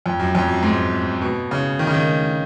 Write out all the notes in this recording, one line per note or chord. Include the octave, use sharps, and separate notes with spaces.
F2
F#2
F2
F#2
G#2
B2
C#3
D#3
C#3
D#3